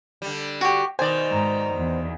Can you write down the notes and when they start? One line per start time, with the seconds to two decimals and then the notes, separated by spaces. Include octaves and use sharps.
0.22 D3 G3
0.61 F#4 G4
0.99 B2 D#3 C5 D5 G#5
1.30 G#2 A#5
1.74 E2